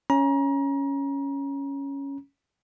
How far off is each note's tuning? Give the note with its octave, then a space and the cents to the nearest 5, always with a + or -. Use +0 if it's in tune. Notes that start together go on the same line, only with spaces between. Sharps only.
C#4 +0 A#5 +30